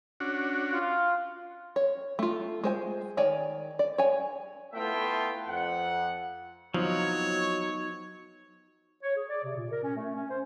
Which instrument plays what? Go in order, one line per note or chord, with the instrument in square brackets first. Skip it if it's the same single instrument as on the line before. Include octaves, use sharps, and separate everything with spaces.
[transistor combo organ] C#4 D4 F#4
[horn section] F4
[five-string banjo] C#5
A3 F4
G#3 C5 G#5
D#3 C#5 D5 G#5
D5
C#5 G#5
[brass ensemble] A3 B3 E4 F4 E5 G5
F2 F#5
[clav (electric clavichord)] F3 [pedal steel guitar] F#3 [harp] B3 C4 D#4 [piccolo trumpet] C#5
[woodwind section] C#5
G#4
D5
C3
A#2
A#4
C#4
A3
C#4
C5